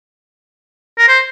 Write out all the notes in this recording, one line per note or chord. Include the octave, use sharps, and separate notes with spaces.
A#4
C5